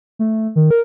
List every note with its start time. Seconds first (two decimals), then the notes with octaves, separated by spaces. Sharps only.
0.19 A3
0.56 D#3
0.71 A#4